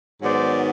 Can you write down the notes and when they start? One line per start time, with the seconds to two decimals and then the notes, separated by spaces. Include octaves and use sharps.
0.22 G#2 D#3 F#3 B3 C5 D5